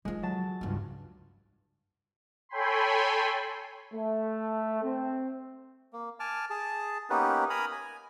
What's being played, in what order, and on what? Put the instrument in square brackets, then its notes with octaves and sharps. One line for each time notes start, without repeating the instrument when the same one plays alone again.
[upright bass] D#3 F3 [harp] G#3
[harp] F#3 A5
[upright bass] C#2 G2
[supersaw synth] A4 C#5 G5 G#5 B5 C6
[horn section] A3
C4
[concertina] A#3
G#5 A5 D6 F6
G#4 A5
A#3 B3 C#4 D#4 G4 B4
A#4 G#5 A#5 B5 D#6
G#5